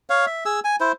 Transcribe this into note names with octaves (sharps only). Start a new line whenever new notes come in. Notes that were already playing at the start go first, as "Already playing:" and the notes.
C#5 F5
E5
G#4 E6
G#5
E4 C5